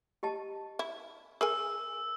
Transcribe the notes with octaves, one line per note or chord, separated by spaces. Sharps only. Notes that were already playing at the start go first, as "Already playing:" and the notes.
G4 D#5 A5
E4
G#4 A#4 G#5 E6